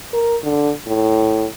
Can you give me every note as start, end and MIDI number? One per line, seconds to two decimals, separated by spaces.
0.13 0.37 70
0.43 0.72 50
0.87 1.46 45